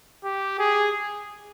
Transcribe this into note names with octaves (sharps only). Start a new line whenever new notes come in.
G4
G#4